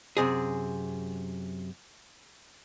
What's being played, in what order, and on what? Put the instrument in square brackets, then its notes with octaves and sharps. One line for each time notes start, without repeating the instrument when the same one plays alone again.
[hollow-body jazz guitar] F#2 C3 G#4